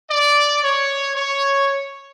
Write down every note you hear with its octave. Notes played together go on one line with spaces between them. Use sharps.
D5
C#5
C#5